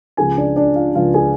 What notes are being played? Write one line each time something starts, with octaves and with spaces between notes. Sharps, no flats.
C#2 C#3 F3 G#4 G#5
D4 D5
D4 D5
F4 F5
C#2 C#3 F3 F4 F5
G#4 G#5